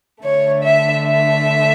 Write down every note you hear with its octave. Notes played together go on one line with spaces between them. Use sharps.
D3 A3 C#5
E5
E5